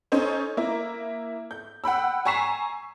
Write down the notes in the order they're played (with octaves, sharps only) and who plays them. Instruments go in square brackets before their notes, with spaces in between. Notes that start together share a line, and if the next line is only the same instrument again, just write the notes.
[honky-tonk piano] C#4 D#4 A4 C5
A#3 E4
G6
F#5 G5 B5 E6
G#5 A#5 C#6 B6 C7 E7